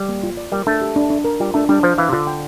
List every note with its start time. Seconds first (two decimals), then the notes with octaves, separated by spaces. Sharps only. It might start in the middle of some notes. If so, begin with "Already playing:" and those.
Already playing: G3
0.09 A#3
0.23 F4
0.37 D5
0.52 G3 A#4
0.67 A3 D4
0.81 G4
0.96 D4
1.10 D4
1.24 A#4
1.40 G3 F4
1.54 A3 D4
1.69 G3 D4
1.83 F3 C5
1.98 E3 F5
2.09 C3
2.13 D3 F4
2.27 G5